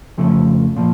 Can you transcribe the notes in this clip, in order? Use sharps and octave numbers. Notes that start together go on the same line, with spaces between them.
F2 C#3 F3 A3
A#2 F3